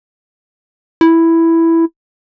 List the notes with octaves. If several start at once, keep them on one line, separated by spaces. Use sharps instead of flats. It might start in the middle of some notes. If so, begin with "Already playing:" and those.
E4